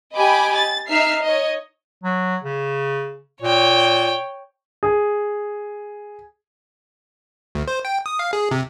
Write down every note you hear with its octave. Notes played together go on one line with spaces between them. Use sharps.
G4 D#5 G#5 B5 D6
A6
D#4 E5 F6 C7
C#5 D#5
F#3
C#3
A#2 C#5 G5
G#4
D2
C5
G5
D#6
F5
G#4
C3